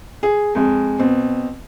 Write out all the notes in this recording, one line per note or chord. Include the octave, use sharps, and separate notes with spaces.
G#4
F2 G#3
B2 C4